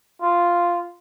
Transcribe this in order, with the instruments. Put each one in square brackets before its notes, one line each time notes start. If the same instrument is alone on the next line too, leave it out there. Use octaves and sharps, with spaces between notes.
[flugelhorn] F4